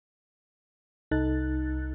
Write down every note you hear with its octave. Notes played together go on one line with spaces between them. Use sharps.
C2 D#4 A4 F#6 A6